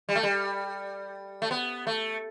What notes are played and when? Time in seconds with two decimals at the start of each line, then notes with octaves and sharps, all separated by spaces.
0.09 G3
0.15 A3
0.23 G3
1.42 A3
1.51 B3
1.87 A3